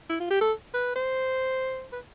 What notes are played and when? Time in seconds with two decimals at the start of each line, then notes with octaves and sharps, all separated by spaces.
0.09 E4
0.20 F4
0.30 G4
0.41 A4
0.74 B4
0.95 C5
1.92 B4